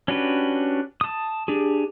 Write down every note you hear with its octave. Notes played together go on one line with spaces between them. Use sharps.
C#4 D4 F#4 G4 B4
A5 D#6
D4 G4 G#4